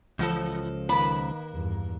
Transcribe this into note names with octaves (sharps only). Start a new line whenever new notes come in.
C#2 E3 F3 A4
D#3 A#3 B4 B5
E2 G2